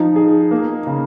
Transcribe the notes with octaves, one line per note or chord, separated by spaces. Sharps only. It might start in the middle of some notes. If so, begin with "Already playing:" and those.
Already playing: F3 D#4
G#4
A#3
C#3